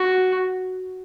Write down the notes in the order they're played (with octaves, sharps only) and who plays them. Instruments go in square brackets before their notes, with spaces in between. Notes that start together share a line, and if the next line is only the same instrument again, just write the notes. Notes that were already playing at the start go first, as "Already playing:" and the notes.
Already playing: [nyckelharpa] F#4